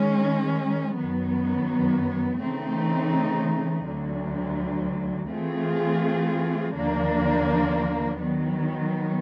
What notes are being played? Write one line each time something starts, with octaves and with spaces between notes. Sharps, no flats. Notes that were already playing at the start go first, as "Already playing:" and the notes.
Already playing: D#3 G#3 C#4
F#2 D#3 F#3 B3
C#3 E3 A3 C4 D#4
D2 D3 F#3
E3 A3 C4 F4 G#4
D#2 D3 F3 A#3 D4
D#3 F#3 B3